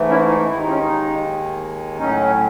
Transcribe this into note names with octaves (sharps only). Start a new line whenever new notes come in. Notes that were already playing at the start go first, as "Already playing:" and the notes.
Already playing: G#2 E3 A3
C#4 E4
D#4
D#2 D#3 G#3 E4
D#4
C#4
D#4
A2 F#3 C#4 D#4